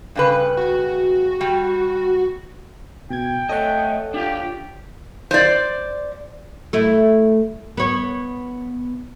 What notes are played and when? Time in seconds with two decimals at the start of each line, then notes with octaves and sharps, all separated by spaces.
0.15 G2 C#3 B4
0.57 F#4
1.41 G3
3.10 B2 G5 G#6
3.49 A3 A4 C#5 D#5 F#5
4.14 D4 F4 G4
5.31 C5 D5
6.73 A3 E4
7.77 B3 C#5